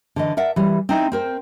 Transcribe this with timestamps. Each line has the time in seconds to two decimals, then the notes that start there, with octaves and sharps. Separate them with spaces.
0.16 D3 E3 D#5
0.37 A#4 D5 E5 F#5
0.56 E3 G3
0.89 C4 D#4 E4
1.12 C4 A#4 C5